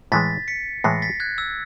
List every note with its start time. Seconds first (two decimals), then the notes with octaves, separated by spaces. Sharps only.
0.12 A2 E3 G#3 A6 B6
0.48 B6 C#7
0.84 A2 E3 G#3 A#6 C7
1.02 A6 B6
1.20 F#6 G#6
1.38 E6